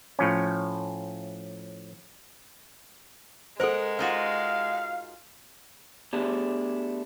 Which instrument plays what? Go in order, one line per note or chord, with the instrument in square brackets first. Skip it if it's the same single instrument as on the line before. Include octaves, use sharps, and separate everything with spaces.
[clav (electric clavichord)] A2 F3 C#4
[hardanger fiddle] G#3 [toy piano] A4 C5 [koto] A#4 F#5
[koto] D#4 F4 F#4 [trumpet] F5
[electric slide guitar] A3 B3 D4 G4 G#4